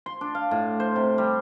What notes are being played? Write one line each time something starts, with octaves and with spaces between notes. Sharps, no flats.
C6
D4
F5
A2
C5
C3
G3